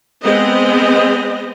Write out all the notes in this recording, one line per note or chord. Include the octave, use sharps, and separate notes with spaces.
G#3 B3 C4 D#5